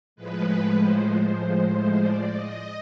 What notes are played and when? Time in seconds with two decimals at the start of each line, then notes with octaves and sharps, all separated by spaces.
0.16 A2 F3 G#3 B4
0.77 C5
1.07 C5
1.99 D5
2.29 D#5